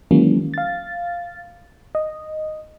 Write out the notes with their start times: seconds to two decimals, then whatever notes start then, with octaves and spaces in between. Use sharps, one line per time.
0.11 D#3 E3 F#3 G#3 A#3 C#4
0.54 F5 A6
1.95 D#5